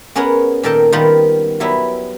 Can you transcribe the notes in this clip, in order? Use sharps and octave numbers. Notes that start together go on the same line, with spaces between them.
B3 C#4 G#4 A#4 C#5 F#5
A#2 D#3 A4 A#4 G5 A5
D#3 G3 B3 F4 A#4
F#3 G3 B3 E4